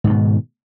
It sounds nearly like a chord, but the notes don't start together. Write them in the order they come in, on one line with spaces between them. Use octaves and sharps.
G#2 D#3 B2